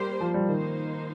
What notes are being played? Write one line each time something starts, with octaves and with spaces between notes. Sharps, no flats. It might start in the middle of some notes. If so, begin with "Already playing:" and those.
Already playing: G3 A#3 G4 C5
F3
G3
D#3 A#3 D#4 C5